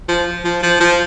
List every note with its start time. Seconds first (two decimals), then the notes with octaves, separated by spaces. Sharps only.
0.08 F3
0.44 F3
0.63 F3
0.80 F3